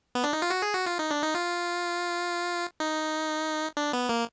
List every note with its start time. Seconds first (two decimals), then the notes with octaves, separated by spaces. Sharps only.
0.15 B3
0.24 D4
0.33 D#4
0.42 F4
0.50 F#4
0.62 G#4
0.74 F#4
0.86 F4
0.99 D#4
1.11 D4
1.23 D#4
1.35 F4
2.80 D#4
3.77 D4
3.93 B3
4.09 A#3